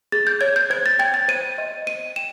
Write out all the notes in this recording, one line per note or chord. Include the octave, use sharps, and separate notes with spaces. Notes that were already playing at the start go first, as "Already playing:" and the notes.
G#4 A6
G6
C#5 G#6
G6
C5 G#6
A6
G5 G#6
A6
C5 D#7
D#5
C5 D#7
G5 E7